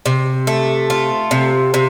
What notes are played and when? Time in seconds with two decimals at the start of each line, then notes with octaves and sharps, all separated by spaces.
0.06 C3
0.47 A3
0.90 F4
1.31 C3
1.74 C3